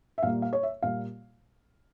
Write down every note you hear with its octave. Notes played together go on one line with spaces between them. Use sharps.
E5
A#2 G3 A#3 F5
F5
C#5
E5
A#2 G3 A#3 F5